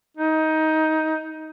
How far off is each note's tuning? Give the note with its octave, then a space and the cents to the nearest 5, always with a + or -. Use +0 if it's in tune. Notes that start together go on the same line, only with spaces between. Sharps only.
D#4 +15